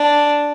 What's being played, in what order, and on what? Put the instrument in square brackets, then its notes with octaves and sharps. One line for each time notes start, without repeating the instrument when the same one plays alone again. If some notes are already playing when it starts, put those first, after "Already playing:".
Already playing: [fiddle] D4